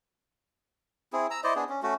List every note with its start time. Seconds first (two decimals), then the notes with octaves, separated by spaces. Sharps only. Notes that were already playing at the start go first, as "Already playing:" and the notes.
1.13 C4 E4 G#4
1.31 A#5 E6
1.44 E4 C5 D5 D#5
1.56 B3 D4 G#4
1.69 C#4
1.83 A3 C#4 F#4